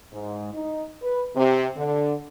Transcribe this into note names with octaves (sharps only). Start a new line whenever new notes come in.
G#2
D#4
B4
C3
D3